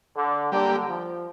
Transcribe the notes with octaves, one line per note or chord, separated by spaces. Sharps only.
D3
D3 G3 A#3 G4 D5
F3